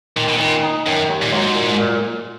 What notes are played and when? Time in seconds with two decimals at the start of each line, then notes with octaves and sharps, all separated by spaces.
0.16 A#2 D#3
0.29 B2
0.39 A#2 D#3
0.63 D#4
0.87 F#2 D#3
1.09 D#2
1.22 A#2
1.32 G#2 F#3
1.55 A#2
1.79 A#2